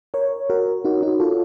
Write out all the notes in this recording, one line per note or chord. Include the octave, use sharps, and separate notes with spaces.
A#4 C#5
F#4 A#4
D#4 F#4
D#4 F#4
F4 A4